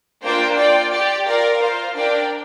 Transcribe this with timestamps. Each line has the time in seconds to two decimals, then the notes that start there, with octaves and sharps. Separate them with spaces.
0.22 A#3 D4 F4 C5 G5
0.56 F4 D5 G5
0.92 G4 D5 G5
1.26 F4 A#4 D5 F5
1.60 F4 C5 F5
1.96 D4 A#4 D5 G5